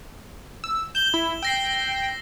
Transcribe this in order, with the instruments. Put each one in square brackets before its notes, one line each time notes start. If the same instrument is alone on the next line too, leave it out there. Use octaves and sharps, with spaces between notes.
[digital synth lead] E6
[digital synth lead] G6 [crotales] E7 G7
[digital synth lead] E4
[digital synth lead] G5 [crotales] E6 A#6 C7